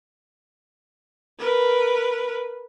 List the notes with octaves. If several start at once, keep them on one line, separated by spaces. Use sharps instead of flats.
A#4 B4